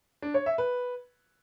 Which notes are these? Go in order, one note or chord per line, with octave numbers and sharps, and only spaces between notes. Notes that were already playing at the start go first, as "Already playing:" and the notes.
D4
C#5
E5
B4